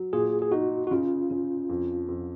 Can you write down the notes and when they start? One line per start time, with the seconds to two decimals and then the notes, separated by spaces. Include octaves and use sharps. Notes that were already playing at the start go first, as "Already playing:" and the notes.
Already playing: F#3
0.13 A#2 G#4
0.42 G#4
0.52 D#4 F#4
0.87 F#4
0.91 C#3 F4
1.30 C#3
1.69 F2
2.08 F2